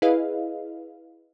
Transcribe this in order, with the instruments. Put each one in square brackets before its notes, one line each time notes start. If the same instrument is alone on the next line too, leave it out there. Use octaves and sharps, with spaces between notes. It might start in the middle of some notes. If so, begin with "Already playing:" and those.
[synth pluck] E4 G#4 B4 D#5 F5